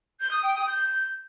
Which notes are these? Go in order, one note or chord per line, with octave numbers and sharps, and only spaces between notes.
G6
D#6
G5
D#6
G6